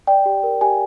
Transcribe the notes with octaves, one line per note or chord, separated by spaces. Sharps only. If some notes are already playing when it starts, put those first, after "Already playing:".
D5 G5
G4
A#4
G4 G#5